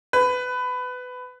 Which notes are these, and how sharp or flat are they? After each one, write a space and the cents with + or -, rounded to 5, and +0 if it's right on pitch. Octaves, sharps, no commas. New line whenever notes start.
B4 +20